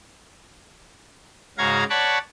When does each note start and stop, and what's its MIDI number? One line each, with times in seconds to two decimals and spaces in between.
1.58 1.84 44
1.58 1.84 49
1.58 1.84 66
1.58 1.84 77
1.58 1.84 82
1.58 1.84 92
1.90 2.18 73
1.90 2.18 74
1.90 2.18 78
1.90 2.18 81
1.90 2.18 83
1.90 2.18 85